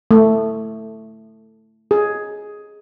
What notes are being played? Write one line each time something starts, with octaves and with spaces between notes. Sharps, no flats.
A3
G#4